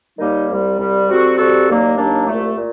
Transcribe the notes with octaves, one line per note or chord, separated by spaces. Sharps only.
D#2 D#3 G3 A#3 D#4
C2 C3 G3
C2 C3 G3
C3 G3 C4 F#4 A4
C3 G3 C4 F#4 A4
D#2 D#3 F#3 A#3 D4
D#2 D#3 F#3 A#3 D4
C2 A#2 A3
A#2